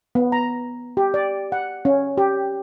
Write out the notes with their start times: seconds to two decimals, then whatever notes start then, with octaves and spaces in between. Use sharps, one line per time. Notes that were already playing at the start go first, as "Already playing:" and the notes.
0.15 B3
0.32 A#5
0.97 G4
1.14 D5
1.52 F#5
1.85 C#4
2.18 G4